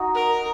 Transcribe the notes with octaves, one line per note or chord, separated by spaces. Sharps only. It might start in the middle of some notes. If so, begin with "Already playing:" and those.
Already playing: D#4 F#4
A#4